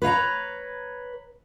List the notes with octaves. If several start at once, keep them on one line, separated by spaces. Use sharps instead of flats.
B4 C#5 F5 A#5